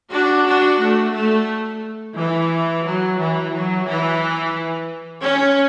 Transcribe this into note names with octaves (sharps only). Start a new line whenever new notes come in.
D4 F#4
D4 F#4
A3
A3
E3
F#3
E3
F#3
E3
C#4